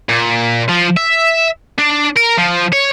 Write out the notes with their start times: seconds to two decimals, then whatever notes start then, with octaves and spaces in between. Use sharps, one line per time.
0.09 A#2
0.69 F3
0.97 E5
1.79 D4
2.17 A#4
2.38 F3
2.73 C#5